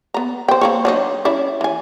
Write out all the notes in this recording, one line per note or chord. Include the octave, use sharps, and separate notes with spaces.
B3 A#5
C5 G5
A#3 C4 C#5
F#3 D4 D#4
C#4 E4 D5
E3 G#5